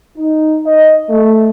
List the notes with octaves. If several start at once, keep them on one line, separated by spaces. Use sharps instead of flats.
D#4
D#5
A3